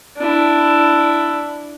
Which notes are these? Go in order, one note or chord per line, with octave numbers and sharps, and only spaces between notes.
D4 E4